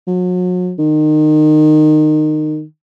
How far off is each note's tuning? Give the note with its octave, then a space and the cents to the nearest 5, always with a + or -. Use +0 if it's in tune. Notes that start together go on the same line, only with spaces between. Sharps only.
F#3 -40
D#3 -25